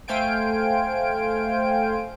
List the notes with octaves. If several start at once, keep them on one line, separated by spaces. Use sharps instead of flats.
A3 C5 F5 G5 G#5 D7